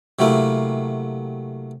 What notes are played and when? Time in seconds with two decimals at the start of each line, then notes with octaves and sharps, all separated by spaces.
0.19 C3 F#3 A3 A#3 E4